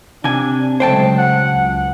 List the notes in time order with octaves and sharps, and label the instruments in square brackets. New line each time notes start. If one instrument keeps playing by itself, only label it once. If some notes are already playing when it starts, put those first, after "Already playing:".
[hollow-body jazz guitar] C3 G#5 [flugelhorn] D4
[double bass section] C#3 F#3 G#3 [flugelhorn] A3 [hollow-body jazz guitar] C5 G5 A5
[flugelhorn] F#5
[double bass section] C#2